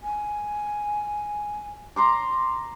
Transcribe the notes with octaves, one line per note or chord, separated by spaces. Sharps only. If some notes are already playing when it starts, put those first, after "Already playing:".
G#5
A#5 C6 D6